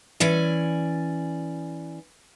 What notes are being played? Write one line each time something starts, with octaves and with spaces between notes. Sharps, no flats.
E3 C#4 D5 G#5